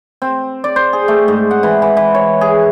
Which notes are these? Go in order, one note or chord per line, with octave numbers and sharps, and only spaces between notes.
C4
D5
C5
G#4
A3
G#2
F#5
E3
E3
E3
C#5
G#4